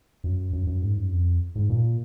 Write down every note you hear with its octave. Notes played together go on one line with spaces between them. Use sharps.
F#2
F#2
F#2
G#2
F#2
F2
G#2
A#2